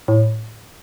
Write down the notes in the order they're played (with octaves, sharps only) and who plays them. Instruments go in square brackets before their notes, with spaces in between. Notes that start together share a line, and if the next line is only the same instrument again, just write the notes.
[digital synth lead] A2